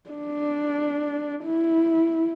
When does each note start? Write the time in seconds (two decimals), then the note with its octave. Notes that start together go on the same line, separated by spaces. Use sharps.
0.10 D4
1.45 E4